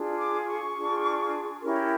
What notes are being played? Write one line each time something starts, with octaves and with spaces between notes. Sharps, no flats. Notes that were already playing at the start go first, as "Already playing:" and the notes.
Already playing: D4 F4 G#4
D6
C#6
D4 F4 G#4
C#4 E4 G4 A#4